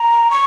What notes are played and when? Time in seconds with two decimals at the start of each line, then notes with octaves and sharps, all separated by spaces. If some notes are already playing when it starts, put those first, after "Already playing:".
Already playing: A#5
0.31 C#6